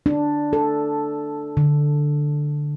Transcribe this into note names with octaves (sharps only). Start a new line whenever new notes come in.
D4
A4
D3